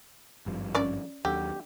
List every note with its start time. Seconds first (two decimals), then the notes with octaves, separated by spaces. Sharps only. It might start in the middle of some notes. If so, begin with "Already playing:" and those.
0.46 G#1 G2 F3
0.75 C#4 D5
1.25 D#2 D3 F#3 G4